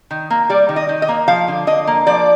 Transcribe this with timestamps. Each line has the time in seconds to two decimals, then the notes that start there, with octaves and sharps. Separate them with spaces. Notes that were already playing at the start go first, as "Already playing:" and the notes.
0.11 D#3
0.30 A#3
0.50 G3 D5
0.69 D#3
0.76 D#5
0.89 D#3
1.02 D#5
1.09 A#3
1.28 F3 F5
1.48 D3
1.67 D3 D#5
1.87 A#3
2.07 F3 D5